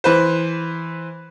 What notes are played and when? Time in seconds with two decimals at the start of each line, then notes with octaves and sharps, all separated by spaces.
0.04 E3 B4 C5